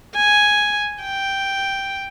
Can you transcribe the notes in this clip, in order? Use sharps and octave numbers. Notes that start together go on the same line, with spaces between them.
G#5
G5